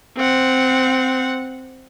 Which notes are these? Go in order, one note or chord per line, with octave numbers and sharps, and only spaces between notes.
C4 F#5